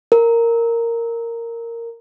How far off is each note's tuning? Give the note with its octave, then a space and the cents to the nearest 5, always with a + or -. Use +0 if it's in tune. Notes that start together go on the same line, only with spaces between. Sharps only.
A#4 -10